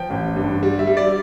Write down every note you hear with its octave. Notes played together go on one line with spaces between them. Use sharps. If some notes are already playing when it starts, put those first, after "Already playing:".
Already playing: F3 G5
A1
G2
G3
E5
G3
D5